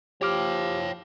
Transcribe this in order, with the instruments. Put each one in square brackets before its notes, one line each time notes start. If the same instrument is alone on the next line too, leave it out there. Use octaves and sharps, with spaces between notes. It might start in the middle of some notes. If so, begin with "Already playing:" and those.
[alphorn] F3 [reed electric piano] G4 D6 F6 [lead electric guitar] C#5 G5